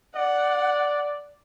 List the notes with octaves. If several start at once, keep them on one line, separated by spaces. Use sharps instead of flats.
D5 F#5